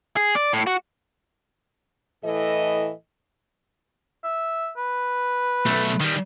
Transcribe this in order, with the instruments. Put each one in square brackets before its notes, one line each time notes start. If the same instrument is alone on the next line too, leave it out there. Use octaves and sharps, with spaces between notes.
[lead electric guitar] G#4
D5
A2
F#4
[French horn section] A2 E3 A4 D#5
[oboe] E5
B4
[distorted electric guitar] B1 A3
D#3 G3